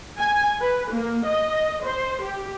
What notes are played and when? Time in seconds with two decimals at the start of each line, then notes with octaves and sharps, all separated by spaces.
0.19 G#5
0.61 B4
0.91 A#3
1.25 D#5
1.84 C5
2.23 G4